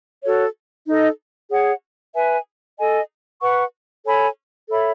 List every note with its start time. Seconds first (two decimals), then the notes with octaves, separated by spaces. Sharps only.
0.23 F#4 A4 C#5
0.86 D#4 A4 D#5
1.50 G#4 C#5 F#5
2.15 B4 E5 G#5
2.78 A4 D#5 G#5
3.41 B4 F#5 C#6
4.05 A4 C#5 G#5 B5
4.69 A4 C#5 E5 B5